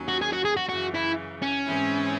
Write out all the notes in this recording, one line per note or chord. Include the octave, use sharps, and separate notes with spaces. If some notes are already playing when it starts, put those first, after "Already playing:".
Already playing: D#2 D#3 F#3 C#4
F#4
G#4
F#4
G#4
F#4
F#2 C#3 E3 F#4
E4
C#4
G#2 E3 C4 E4 G#4